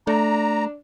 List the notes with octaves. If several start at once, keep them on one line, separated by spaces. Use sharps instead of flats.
A3 D4 A#5